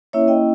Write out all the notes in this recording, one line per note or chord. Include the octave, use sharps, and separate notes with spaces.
A#3 C#4 E4 C#5 E5
D#5 G5